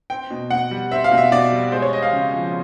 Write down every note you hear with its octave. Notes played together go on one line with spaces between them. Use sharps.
C4 G5
B2
B2 F#5
G3
C4 E5
F5
B2
E5
B2 D5
G3
G#3 C5
C#5
C4 D#5
F5
C#3
F3